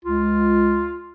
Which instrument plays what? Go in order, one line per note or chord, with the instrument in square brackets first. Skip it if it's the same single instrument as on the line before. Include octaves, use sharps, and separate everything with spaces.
[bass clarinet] C#2 [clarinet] F4